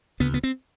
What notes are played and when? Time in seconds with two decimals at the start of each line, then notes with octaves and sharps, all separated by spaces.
0.20 D2 C#3 B3
0.34 B3
0.44 C4